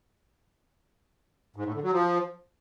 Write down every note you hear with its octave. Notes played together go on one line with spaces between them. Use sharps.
G#2
A2
D3
F#3
F3